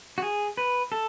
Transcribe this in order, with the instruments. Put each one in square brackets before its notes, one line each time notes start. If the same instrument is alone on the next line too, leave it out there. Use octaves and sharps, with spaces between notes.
[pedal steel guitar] F#4
G#4
B4
A4